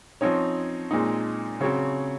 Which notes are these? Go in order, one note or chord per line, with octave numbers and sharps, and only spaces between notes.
F3 C4 C#4 D#4 C#5
A#2 G#3 C4 D#4
C#3 F#3 C4 C#4 C#5